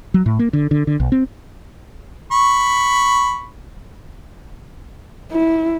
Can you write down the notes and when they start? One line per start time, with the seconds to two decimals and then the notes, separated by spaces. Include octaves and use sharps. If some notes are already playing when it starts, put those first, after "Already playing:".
0.14 F#3
0.26 A2
0.39 A#3
0.53 D3
0.71 D3
0.87 D3
1.00 B1
1.12 C4
2.32 B5 C#6
5.32 E4